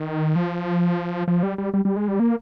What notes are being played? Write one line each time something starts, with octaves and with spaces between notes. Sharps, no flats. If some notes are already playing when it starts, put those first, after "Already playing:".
Already playing: D#3
F3
F3
G3
G3
G3
G3
G#3
G3
A#3